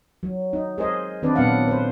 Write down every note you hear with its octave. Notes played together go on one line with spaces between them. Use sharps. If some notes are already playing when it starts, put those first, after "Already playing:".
F#3
D#4
G#4 A#4 C5 D#5
D#3 C4 D4 B4 D5
A#2 F#3 B3 D4 F5 F#5
B4 C5